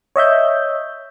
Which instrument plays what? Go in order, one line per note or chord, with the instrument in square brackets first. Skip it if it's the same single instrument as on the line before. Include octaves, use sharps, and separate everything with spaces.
[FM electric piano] C#5 D#5 E5 G6